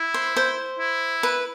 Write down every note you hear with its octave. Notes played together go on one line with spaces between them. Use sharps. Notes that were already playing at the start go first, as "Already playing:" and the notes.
Already playing: E4
C5
C5
E4
B4